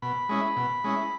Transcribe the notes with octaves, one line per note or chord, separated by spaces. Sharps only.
B2 B5
G#3 C#4 E4
B2
G#3 C#4 E4